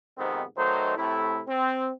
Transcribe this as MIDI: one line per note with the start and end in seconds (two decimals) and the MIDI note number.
0.18 0.43 41
0.18 0.43 44
0.18 0.43 48
0.18 0.43 51
0.18 0.43 59
0.18 0.43 60
0.57 0.95 51
0.57 0.95 54
0.57 0.95 57
0.57 0.95 63
0.57 0.95 72
0.96 1.40 45
0.96 1.40 48
0.96 1.40 57
0.96 1.40 64
1.48 1.90 60